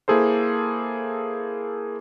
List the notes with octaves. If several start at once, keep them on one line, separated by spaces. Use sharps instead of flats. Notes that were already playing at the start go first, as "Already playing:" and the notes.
A#3 E4 G#4 A4 C5